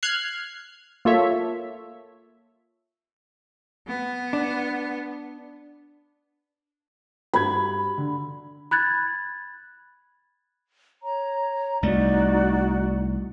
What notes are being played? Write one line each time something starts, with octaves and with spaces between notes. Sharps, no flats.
F6 F#6 G#6 C7
A#3 F4 A4 C#5 E5
B3
D4
G2 F#4 B5 G#6
D3
B5 F#6 G#6 A6
C#5 A#5
C2 A3 D#4 F#4 D5